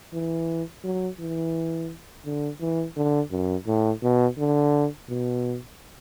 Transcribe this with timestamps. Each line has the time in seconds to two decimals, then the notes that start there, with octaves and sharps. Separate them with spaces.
0.13 E3
0.84 F#3
1.19 E3
2.25 D3
2.60 E3
2.96 D3
3.31 F#2
3.67 A2
4.02 B2
4.38 D3
5.08 B2